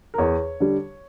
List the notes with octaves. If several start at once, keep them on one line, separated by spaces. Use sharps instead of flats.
A#4
E2 C#5
D3 G3